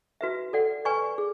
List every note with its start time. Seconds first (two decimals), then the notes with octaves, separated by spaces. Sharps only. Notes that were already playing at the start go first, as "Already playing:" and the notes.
0.21 F#4 B4 E5
0.53 A4 D5 F#5
0.85 B4 D5 G#5 C#6
1.18 G#4